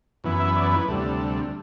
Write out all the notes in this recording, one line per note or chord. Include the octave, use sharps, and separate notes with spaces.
F#2 E3 B3 E4
E5
D5
B4
D2 C3 G3 D4 A4